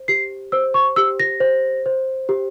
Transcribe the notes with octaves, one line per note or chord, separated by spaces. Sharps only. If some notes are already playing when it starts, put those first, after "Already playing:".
Already playing: C5
G4 C7
C5 E6
C#6
G4 E6
A#6
C5
C5
G4